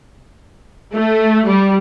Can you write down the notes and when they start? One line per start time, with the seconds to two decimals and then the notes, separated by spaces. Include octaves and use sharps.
0.94 A3
1.48 G3